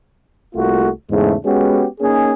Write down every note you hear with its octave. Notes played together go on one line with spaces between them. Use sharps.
C2 A3 A#3 F4 F#4
E2 G#2 C#3 G#3 A3
G#3 B3 C#4 F#4 G4
A#3 C#4 D#4 G#4